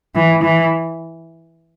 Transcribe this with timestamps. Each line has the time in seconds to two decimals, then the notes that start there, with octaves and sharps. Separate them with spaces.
0.15 E3
0.43 E3